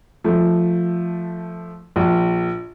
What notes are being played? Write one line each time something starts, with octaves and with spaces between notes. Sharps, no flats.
F3 A3
A#1